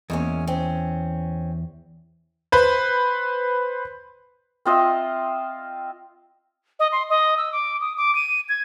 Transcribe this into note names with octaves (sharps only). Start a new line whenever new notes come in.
E2 G#3 A#3 C#4
C4 C#4
B4 C5
C4 F4 D#5 E5
D#5
C6
D#5
E6
D6
D#6
D6
D#7
G#6